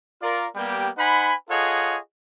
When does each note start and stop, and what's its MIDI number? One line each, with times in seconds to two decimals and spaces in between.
0.22 0.47 65
0.22 0.47 70
0.22 0.47 74
0.55 0.89 55
0.55 0.89 58
0.55 0.89 59
0.55 0.89 67
0.55 0.89 79
0.98 1.34 63
0.98 1.34 72
0.98 1.34 78
0.98 1.34 80
0.98 1.34 83
1.50 1.97 65
1.50 1.97 68
1.50 1.97 69
1.50 1.97 73
1.50 1.97 75
1.50 1.97 78